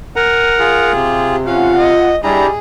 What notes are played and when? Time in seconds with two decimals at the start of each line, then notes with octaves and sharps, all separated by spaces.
0.16 A#4 F#5 G#5 A#5
0.59 F4 G#4
0.94 C3 G4
1.47 C#4 F4 F5 F#5
1.78 D#5
2.24 G3 D4 E4 G#4 A#5